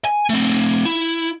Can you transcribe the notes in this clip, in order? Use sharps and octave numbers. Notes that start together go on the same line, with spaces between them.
G#5
A3 C4
E4